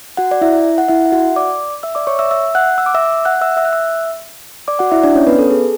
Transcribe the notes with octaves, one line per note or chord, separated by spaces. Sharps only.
F#4 F#5
D5
E4 E5
F#5
E4 E5
E5
F#4 F#5
D5 D6
E5 E6
D5 D6
C#5 C#6
E5 E6
E5 E6
F#5 F#6
E6
D6
E5 E6
F#5 F#6
E5 E6
E5 E6
F#6
E5 E6
D5 D6
F#4 F#5
E4 E5
D4 D5
C#4 C#5
B3 B4
A4
G#4